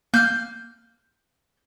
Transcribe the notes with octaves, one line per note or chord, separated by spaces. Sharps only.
A#3 F6 G6